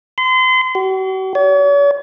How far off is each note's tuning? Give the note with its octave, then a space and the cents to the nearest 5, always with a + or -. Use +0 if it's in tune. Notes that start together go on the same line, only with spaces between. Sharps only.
C6 -35
F#4 +45
C#5 +45